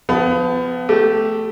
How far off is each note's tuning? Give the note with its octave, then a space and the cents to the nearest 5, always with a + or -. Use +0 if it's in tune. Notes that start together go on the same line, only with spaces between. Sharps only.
F3 +0 B3 +30
A3 +0 G4 -15